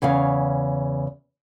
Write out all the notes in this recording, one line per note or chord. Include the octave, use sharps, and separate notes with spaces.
E2 C#3 C#5 F5